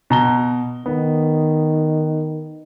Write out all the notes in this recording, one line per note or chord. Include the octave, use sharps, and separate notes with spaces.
B2 A#5 G7
D#3 B3